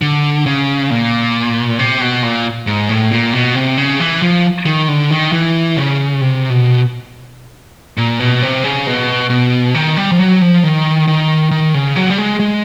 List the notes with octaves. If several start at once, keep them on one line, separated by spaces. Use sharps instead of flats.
D3
C#3
A#2
C3
B2
A#2
G#2
A2
A#2
B2
C3
C#3
E3
F3
D#3
D3
D#3
E3
C#3
C3
B2
A#2
B2
C3
C#3
B2
B2
D#3
G3
F3
F#3
F3
D#3
D#3
D#3
C#3
F#3
G3
G#3
G#3